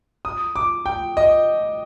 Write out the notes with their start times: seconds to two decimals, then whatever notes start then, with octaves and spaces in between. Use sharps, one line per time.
0.25 D#6
0.56 D6
0.86 G5
1.17 D#5